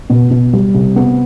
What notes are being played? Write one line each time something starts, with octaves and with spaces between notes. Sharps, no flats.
B2
B2
G3
C3
B3